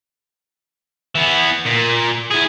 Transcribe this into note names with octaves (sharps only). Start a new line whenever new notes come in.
E3 B3
A#2
E4 G#4